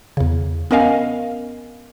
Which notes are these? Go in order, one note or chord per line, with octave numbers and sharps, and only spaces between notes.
E2 C#3
B3 C#4 A#4 D#5 F5 G#5